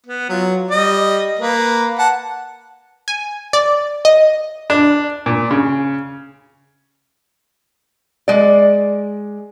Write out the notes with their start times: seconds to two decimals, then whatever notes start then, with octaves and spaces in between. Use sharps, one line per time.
0.06 B3
0.29 F#3 F4
0.71 G3 D#5
1.39 A#3 B4
1.99 F#5 A5
3.08 G#5
3.53 D5
4.05 D#5
4.70 D4
5.26 A#2
5.51 C#3
8.28 G#3 D5